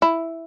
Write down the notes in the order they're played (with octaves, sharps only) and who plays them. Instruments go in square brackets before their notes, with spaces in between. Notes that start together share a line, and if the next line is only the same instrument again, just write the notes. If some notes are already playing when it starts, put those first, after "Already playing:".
[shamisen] E4